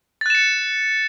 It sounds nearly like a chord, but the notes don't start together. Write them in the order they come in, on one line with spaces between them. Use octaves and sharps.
A6 F#6 E7 C#7